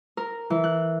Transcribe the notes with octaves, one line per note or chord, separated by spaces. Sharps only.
A#4
E3
F#6